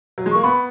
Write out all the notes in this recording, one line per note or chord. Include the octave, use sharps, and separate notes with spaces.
F#3
G#3
A#3 C#6
B3 B5